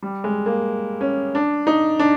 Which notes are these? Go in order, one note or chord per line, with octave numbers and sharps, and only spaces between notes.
G3
G#3
A#3
C#4
D4
D#4
D4